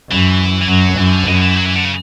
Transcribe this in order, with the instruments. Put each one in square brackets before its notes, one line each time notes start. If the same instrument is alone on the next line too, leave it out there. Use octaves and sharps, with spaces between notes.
[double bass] F#2 [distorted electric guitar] E3
[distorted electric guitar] E3
[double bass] F#2 [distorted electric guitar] F#3
[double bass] F#2 [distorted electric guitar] E3
[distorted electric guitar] D3
[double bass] F#2 [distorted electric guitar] B2
[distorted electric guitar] E3
F#3
E3
D3
C#3